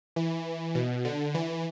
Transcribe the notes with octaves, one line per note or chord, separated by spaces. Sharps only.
E3
B2
D3
E3